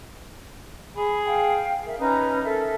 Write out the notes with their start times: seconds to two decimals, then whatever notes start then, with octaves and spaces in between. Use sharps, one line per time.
0.96 G#4 B5
1.27 F5 G5
1.86 A#4 E5
1.99 C#4 D#4 B4 A#5
2.44 A4 A#4 E5